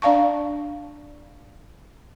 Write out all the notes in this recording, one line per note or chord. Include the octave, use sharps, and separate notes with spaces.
D4 D5 F5 A5 C#6